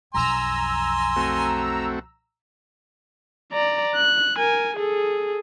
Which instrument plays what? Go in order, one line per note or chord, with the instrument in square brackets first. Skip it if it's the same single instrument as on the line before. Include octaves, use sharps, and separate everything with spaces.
[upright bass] B1 F2 [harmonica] G#5 C6 [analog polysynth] A#5 E6
[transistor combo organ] A3 C4 F#4
[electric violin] D5 A#5
F#6
A#4 G#5
G#4 A4